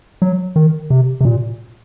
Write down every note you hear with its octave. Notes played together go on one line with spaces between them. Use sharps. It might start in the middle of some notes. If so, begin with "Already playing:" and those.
F#3
D#3
C3
C3
A#2